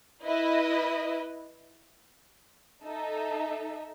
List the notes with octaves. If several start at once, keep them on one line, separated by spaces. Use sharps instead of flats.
E4 B4 D#5
D#4 A4 E5